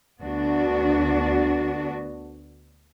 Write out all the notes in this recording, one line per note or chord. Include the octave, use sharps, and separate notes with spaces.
D2 B3 D4 F#4